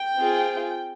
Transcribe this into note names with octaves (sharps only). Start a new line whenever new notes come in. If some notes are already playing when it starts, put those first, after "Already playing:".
Already playing: G5
C4 F4 G#4